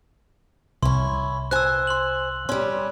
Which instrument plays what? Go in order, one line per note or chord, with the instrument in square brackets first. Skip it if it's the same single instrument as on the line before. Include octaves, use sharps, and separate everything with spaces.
[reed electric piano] C2 [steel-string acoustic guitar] C#4 E4 [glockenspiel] C6
[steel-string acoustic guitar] C5 G#5 [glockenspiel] E6 F#6
[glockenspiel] C6 F#7
[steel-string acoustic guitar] G3 C#4 [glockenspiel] C6